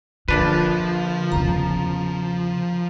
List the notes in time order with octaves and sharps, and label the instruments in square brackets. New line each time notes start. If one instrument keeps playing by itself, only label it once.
[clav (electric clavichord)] A#1 D4 B4 [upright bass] D3 [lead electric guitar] F3
[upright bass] E2 C#3 [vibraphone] A#5